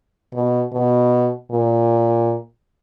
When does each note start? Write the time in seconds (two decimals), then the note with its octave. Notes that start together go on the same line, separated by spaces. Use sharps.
0.33 B2
0.73 B2
1.51 A#2